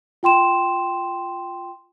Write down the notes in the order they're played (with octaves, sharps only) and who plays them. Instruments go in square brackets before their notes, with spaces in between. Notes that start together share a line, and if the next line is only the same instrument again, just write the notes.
[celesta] F4 G5 C6 E7